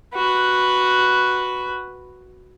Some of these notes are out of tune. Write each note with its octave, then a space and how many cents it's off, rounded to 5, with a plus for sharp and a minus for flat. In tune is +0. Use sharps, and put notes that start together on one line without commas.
F#4 +0 B4 +0